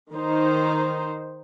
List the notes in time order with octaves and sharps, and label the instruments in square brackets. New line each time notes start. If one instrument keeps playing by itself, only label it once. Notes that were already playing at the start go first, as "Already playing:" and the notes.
[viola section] D#3 D#4 C5